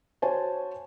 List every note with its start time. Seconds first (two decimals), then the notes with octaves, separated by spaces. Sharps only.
0.22 F#4 C5 C#5 G#5 A5